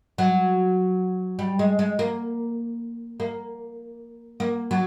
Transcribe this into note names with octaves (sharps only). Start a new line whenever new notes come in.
F#3
G3
G#3
G#3
A#3
A#3
A#3
F#3